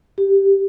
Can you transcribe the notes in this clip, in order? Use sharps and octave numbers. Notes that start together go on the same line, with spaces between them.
G4